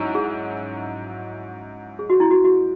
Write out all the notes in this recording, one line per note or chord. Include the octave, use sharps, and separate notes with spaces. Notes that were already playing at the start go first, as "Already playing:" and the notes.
Already playing: G#2 F#3 C#4 E4
G#4
G#4
F#4
E4
F#4
F#4